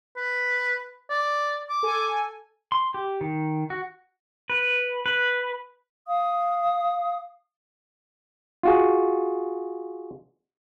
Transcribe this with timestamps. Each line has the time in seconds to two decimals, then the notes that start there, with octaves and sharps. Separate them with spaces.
0.16 B4
1.10 D5
1.69 D6
1.83 A4 G#5
2.72 C6
2.94 G4
3.21 D#3
3.70 F#4
4.50 B4
5.06 B4
6.06 F5 D#6
8.63 F4 F#4 G#4